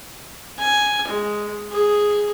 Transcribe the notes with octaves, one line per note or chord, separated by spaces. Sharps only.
G#5
G#3
G#4